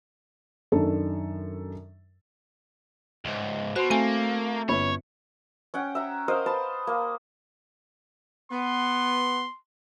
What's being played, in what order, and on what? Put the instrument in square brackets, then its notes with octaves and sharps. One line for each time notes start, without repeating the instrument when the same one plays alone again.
[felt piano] F#2 D#3 D4 A4
[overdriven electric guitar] C#2 G#2
[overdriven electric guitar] B2 [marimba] F#4 [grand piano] C5 C6
[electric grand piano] A3 [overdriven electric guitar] A#3 [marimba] C4 G#5
[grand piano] G1 C#4 B5 [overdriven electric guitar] C#5
[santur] C#4 F#5 G5
E5 A#5
A#4 C5 D#5 F5
B4 C5 A5
A#3
[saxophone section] B3 [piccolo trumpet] C6